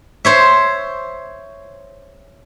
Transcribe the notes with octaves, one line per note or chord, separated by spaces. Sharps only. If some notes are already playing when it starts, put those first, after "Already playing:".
C5 C#5 E5